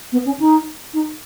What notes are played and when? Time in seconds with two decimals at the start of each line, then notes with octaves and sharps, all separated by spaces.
0.12 B3
0.25 C#4
0.39 D#4
0.93 D#4